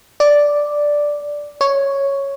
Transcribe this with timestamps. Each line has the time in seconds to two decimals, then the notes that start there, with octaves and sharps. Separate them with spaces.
0.20 D5
1.61 C#5